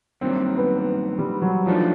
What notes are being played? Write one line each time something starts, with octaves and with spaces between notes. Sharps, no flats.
G2 D#3 F#3 A#3 C4
B3
G3
F#3
F#2 D#3 F3 F#3 A3 D4